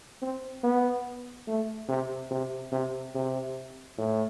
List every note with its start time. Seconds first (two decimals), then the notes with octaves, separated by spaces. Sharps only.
0.22 C4
0.64 B3
1.47 A3
1.89 C3
2.31 C3
2.72 C3
3.15 C3
3.98 A2